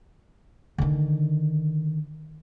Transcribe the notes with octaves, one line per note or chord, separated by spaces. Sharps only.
D3 D#3